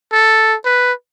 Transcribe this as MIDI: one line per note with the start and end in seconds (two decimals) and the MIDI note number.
0.12 0.55 69
0.65 0.92 71